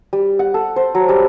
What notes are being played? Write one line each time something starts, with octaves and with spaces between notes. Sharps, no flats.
G3
F#5
A4
C5
F#3
G3